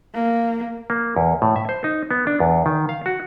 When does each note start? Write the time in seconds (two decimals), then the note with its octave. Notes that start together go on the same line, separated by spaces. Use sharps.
0.15 A#3
0.90 A#3
1.16 E2
1.42 A2
1.56 E5
1.69 C5
1.84 D#4
2.11 B3
2.27 D4
2.40 E2
2.66 D#3
2.89 F5
3.06 F#4